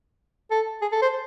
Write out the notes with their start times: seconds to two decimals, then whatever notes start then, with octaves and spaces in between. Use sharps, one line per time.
0.51 A4
0.82 G#4
0.92 A4
1.02 C5